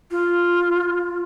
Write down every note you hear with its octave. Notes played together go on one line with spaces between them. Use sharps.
F4